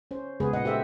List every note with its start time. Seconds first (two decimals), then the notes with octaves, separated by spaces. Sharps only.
0.11 C#4 C5
0.40 C#3 G#3 B3 G#4 B4
0.53 A#2 D#5 F#5
0.65 G4 A4 C5 E5